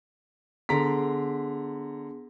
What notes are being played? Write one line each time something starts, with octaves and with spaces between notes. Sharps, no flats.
D3 B3 G#4 A#5 C6 B6